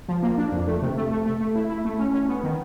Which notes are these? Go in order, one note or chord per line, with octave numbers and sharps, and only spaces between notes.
F3
A#3
D4
F2
A3
C3
A3
A3
A3
A3
E4
E4
A3
C#4
C#4
B3
D#3